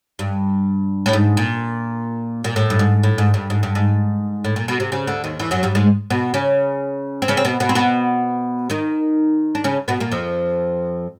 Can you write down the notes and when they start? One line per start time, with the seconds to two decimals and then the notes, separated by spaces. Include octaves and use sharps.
0.19 G2
1.06 A2
1.13 G#2
1.37 A#2
2.44 A#2
2.56 A2
2.70 G2
2.79 G#2
3.03 A2
3.18 G#2
3.34 G2
3.50 G#2
3.63 G2
3.75 G#2
4.44 A2
4.56 A#2
4.68 B2
4.80 C3
4.92 C#3
5.07 D2 D3
5.24 D#2 D#3
5.39 E2 E3
5.51 F#2 F#3
5.63 G2 G3
5.75 G#2 G#3
6.10 B2 B3
6.34 C#3 C#4
7.22 C4
7.28 C#3 C#4
7.37 C4
7.45 B2 B3
7.60 B2 B3
7.69 C4
7.75 B2 B3
8.70 D#3 D#4
9.55 D4
9.64 C#3 C#4
9.88 B2 B3
10.00 A#2 A#3
10.12 F2 F3